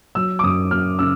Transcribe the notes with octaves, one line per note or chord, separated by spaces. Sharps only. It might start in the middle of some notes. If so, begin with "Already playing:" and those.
F#3 E6
D6
F#2 D#6
F#2 F6
C#3 E6